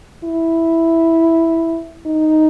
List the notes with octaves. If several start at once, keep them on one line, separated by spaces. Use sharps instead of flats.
E4
D#4